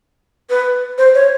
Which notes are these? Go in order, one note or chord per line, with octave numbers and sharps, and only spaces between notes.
B4
C5
C#5